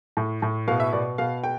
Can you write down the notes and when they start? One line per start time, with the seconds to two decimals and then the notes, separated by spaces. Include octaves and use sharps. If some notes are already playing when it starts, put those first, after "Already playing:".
0.17 A2
0.42 A2
0.68 B2 F5
0.80 E5
0.93 B2 D5
1.18 B2 F5
1.44 G5